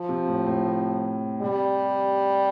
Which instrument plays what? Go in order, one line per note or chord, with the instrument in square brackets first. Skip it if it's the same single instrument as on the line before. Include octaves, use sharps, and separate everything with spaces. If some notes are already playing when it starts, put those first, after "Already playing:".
Already playing: [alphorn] F3
[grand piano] C3
A2
A2
C3
[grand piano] C3 [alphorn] G3